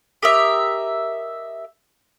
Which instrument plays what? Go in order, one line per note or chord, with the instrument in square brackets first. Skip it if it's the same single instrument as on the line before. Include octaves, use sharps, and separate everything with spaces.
[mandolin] G4 A#4 D#5 E5